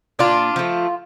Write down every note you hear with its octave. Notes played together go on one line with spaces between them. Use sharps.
A#2 D4 F4
F3 A3